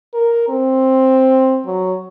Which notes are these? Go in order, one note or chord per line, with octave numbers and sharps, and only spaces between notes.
A#4
C4
F#3